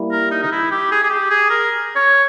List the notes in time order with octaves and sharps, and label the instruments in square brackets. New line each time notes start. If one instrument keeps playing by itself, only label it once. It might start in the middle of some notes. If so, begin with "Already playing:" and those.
Already playing: [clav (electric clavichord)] G3 A#3 E4
[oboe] A#4
D#4
D#4
E4
G4
G#4
G#4
G4
G#4
A#4
C#5